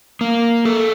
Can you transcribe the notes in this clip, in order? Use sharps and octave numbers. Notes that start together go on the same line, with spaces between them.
A#3
A4